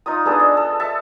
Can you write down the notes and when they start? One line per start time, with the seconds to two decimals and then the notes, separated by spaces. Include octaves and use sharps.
0.06 D#4 F4 D#6
0.25 B3 D4 G#4 A4
0.40 D#5
0.57 A4
0.80 A4 E5 A5